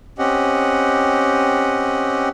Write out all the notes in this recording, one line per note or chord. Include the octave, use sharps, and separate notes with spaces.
C4 C#4 G4 D#5 F#5